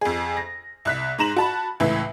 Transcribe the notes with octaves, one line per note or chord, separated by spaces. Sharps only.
F2 G#4
A#6
C2 F#6 B6
G#2 A#5 E7 F#7
F#4 A5 B5
C#2 A2 E3 E5